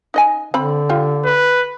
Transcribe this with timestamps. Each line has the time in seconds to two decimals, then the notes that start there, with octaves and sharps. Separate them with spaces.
0.14 D#4 D#5 G#5
0.54 D3 C4 B5
0.89 F4 G4
1.25 B4